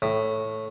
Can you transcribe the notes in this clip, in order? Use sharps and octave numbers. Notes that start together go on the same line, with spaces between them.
A2